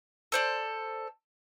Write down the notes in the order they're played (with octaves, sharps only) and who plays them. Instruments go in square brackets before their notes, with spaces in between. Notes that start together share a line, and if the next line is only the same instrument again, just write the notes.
[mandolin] A4 C5 D5